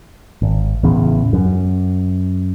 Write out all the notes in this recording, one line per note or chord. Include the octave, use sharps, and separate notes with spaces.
G#1
A1 E2 C#3
F#2